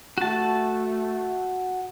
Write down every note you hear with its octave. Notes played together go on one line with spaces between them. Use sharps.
A3 F#4 A5